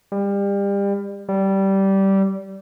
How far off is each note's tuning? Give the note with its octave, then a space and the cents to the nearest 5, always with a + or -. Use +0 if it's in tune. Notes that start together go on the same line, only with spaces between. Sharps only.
G3 +30
G3 -15